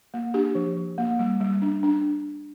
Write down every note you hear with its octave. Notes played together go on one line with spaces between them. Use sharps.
A#3
D4 G4
F3
F3
A#3
G3
G3
D4
D4